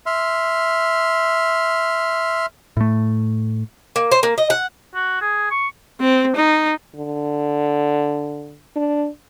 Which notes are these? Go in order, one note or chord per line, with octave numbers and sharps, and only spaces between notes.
E5 C6 F6
A2 A3
A#3
C5
A#3
D#5
F#5
F#4
G#4
C#6
C4
D#4
D3
D4